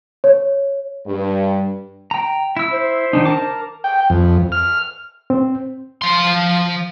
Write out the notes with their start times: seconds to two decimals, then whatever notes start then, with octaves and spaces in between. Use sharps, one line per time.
0.24 C#5
1.06 G2
2.11 G5 A#5
2.57 E4 E6
2.72 C5
3.13 D#3 D4 D#4
3.25 A#4 A5 D6
3.84 G5
4.10 F2
4.52 F6
5.30 C4
6.02 F3 C6